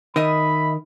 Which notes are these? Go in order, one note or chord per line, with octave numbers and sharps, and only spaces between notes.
D#3 D#5 E5 B5 D#6